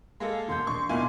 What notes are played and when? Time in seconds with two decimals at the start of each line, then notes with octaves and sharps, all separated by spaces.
0.20 G#3 A#3 A4 F5
0.48 E1 C6 G6
0.67 A#1 C#6
0.89 B1 E2 A#2 E4 F4 G#5 C6